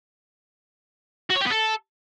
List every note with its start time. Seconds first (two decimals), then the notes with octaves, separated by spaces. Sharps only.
1.30 F#4
1.36 C#5
1.41 G4
1.47 B3
1.52 A4